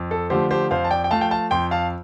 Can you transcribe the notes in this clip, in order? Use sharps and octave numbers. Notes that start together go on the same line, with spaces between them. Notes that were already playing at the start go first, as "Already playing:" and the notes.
Already playing: F2
A4
D3 F3 A3 G4 C5
G4 C5
F2 C5 F5
A5
D5 G5
G5
F3 A3 F5 A5
G5
F5 A5
F2 G5 C6
F5 A5